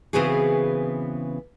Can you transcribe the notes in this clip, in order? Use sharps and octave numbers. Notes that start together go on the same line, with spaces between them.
C#3 E3 B3 C4 F#4 G#4